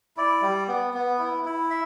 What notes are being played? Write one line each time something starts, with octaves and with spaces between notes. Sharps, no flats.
E4 D5
G3
B3
B3
E4
E4
E5